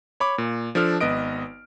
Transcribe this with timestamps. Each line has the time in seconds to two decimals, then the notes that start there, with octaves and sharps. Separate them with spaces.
0.20 C#5 B5 D6
0.38 A#2
0.75 F3 D4 A4 F6
1.01 G#1 B3 B4 D#5 D7